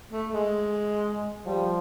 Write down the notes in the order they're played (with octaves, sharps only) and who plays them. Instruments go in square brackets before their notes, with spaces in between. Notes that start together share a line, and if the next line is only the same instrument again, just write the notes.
[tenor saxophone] A3
G#3
[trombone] F3 [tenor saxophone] G3